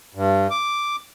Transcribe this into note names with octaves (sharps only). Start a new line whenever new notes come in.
G2
D6